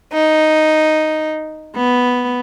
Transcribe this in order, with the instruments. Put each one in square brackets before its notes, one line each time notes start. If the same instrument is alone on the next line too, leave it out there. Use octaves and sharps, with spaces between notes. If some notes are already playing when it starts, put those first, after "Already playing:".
[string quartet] D#4
B3